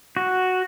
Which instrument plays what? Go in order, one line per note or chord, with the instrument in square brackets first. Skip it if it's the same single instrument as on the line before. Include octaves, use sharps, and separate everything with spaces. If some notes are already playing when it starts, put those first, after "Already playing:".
[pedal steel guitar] F#4